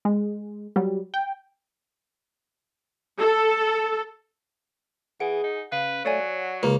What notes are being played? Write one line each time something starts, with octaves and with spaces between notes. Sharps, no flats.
G#3
F#3 G3
G5
A4
E3 G#4 F#5 D7
D#4
C#3 B4 F5
F#3 A3 C#5 D5 G#5
F#5
C#2 A#3 A#4